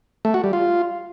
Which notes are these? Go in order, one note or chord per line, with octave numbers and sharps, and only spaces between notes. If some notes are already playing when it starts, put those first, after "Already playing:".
A3
F#4
G3
F4